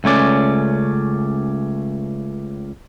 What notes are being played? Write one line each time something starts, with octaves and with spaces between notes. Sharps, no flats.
C#2 A3 C#4 D5